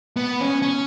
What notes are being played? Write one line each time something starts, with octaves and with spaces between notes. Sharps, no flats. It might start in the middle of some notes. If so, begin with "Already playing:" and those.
B3
C#4
C#4